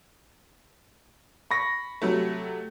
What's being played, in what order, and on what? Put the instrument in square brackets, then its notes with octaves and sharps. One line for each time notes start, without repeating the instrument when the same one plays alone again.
[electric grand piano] B5 C#6 A#6
[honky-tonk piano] C3 F#3 A3